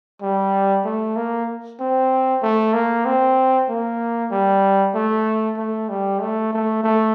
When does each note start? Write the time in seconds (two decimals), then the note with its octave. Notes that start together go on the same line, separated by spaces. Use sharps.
0.22 G3
0.84 A3
1.16 A#3
1.79 C4
2.42 A3
2.74 A#3
3.05 C4
3.69 A#3
4.31 G3
4.94 A3
5.57 A3
5.89 G3
6.20 A3
6.52 A3
6.83 A3